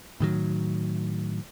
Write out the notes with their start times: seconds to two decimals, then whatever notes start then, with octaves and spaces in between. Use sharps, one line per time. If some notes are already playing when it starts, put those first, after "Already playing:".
0.20 A2 D#3 F#3